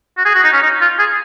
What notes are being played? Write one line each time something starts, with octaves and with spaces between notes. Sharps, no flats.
F#4
G#4
F#4
D#4
C#4
D#4
F4
G#4